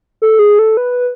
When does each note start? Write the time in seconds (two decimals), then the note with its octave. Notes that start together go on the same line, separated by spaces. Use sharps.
0.22 A4
0.39 G#4
0.59 A4
0.77 B4